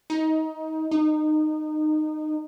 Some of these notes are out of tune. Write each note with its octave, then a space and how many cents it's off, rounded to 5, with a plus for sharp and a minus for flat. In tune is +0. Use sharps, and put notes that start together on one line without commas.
D#4 +20
D#4 -20